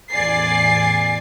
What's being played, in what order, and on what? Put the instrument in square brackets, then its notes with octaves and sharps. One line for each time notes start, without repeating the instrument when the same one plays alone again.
[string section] A1 E2 D5 G#5 A6 C7